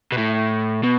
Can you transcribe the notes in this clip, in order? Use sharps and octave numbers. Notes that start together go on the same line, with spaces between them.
B2
A2
B2